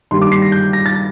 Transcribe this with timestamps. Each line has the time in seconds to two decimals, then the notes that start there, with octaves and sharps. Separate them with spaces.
0.11 G2 D#3 G3 A#3 C6
0.21 D6
0.32 C7
0.42 A#6
0.52 G6
0.73 A#6
0.86 A6